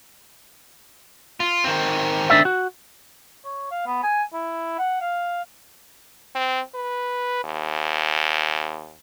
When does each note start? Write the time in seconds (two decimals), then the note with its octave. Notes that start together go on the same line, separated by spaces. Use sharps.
1.40 F4
1.64 D#3 C4
2.30 D4 D5 E5
2.45 F#4
3.45 C#5
3.71 F5
3.87 B3
4.03 G#5
4.34 E4
4.79 F#5
5.01 F5
6.35 C4
6.75 B4
7.44 D#2